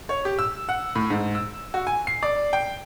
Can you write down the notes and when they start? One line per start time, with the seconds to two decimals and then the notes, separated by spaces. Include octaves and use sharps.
0.09 C#5
0.25 G4
0.39 E6
0.69 F#5
0.96 A2
1.10 G#2
1.35 E6
1.74 F#4
1.87 G#5
2.07 C7
2.23 D5
2.53 G5